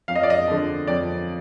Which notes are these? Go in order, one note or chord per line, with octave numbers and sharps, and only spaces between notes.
F2 F5
D#5
D5
D#5
D3 F3
F2 D5